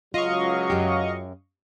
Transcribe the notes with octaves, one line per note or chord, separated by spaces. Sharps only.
C#2 F#3 F4 D#5 F5 C#6
F#2 G4